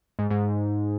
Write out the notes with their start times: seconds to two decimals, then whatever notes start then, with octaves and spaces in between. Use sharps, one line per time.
0.19 G#2
0.30 G#2